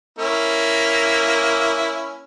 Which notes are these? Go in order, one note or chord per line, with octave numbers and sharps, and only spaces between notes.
A#3 C#4 E4